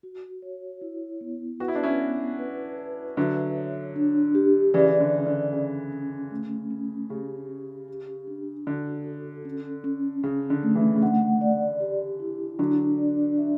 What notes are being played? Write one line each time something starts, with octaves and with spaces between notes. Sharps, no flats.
F#4
C#5
E4
B3
F#4 B4
E4
D4
C#4 E4
B3
B4
B4
D3 F#3 E5
C#5
D4
G4
C#3 E3 D5
C#3
D3
C#3 D5
D3
C#3 C#4
C#4
A3
C#4
C#3 G4
C#4
G4
D4
D3 F#4
A4
C#4
C#4
C#3 C#4
D3
A3
C#3 E3
C#3
D3 F#5
D5
G4
E4
D3 F#3 D4
D5
E5